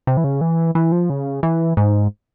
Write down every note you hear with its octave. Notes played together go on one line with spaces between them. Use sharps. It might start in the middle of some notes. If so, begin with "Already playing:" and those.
C3
E3
C#3
E3
E3
F3
C#3
E3
G#2